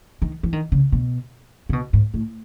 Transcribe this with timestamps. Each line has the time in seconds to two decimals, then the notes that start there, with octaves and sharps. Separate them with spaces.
0.22 D#3
0.43 E3
0.53 D#3
0.72 C#3
0.92 B2
1.69 C#3
1.73 B2
1.93 G#2
2.14 A2